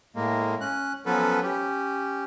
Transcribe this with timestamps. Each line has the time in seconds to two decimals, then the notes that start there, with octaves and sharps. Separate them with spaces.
0.16 A2 G#3 A#3
0.61 C#4 F#6
1.06 F3 F#3 B3 C#4 A4 B4
1.43 C#4 G4